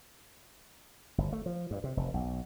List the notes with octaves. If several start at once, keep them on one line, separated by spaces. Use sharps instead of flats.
G1
A3
F3
G2
C3
F1
B1